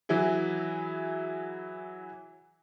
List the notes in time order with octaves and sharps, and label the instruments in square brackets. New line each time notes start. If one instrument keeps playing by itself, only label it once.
[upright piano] E3 F#3 E4 G#4